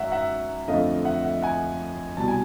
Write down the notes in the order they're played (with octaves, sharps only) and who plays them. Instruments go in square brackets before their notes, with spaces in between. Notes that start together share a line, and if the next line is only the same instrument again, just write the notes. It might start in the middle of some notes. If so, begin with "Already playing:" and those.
Already playing: [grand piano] F#2 D#3 G#3 E5 F#5
E5 F#5
F2 D3 F3 A3 D#5 F5
E5 F#5
E5 F#5
F#5 G#5
C2 B2 G3 A5
G#5